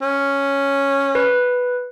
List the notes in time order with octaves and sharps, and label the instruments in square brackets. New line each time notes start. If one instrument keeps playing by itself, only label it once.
[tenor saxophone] C#4
[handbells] B4